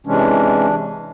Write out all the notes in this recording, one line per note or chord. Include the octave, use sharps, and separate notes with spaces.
C3 E3 G#3 C#4 D4